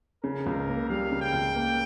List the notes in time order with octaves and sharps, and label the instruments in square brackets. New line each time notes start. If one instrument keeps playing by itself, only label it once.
[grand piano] C#3 [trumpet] A#4
[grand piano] C#2
A#3
[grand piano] G3 [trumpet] F5
[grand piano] C#3
[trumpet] G5
[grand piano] C#2
A#3